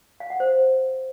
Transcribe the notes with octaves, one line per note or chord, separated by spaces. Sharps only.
F5
F#5
C5